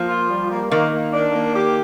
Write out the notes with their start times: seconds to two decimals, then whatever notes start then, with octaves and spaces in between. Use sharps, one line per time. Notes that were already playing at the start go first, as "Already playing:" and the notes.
Already playing: F3 A#3
0.09 F4
0.30 G3
0.51 A#3
0.71 D#3 A#3
0.93 A#3
1.13 D4
1.35 A#3
1.55 G4